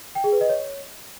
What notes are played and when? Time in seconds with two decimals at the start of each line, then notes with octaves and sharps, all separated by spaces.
0.15 G5
0.24 G#4
0.32 B4
0.41 D#5
0.49 C#5